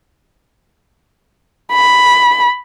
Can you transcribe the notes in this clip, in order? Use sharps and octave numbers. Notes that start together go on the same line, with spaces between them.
B5